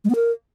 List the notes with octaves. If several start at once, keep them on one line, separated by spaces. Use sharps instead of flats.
G#3
B3
A#4